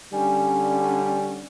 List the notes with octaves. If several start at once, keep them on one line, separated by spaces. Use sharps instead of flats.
D3 G3 C#4 G#5